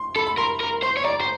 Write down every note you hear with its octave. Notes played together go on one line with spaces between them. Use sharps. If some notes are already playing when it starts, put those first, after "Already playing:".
Already playing: C6
A4 B5
B5
A#4 C6
A#4
C5 C6
C#5
D5 A#5
C5